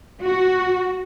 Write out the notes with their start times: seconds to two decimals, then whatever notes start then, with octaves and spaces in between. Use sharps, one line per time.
0.22 F#4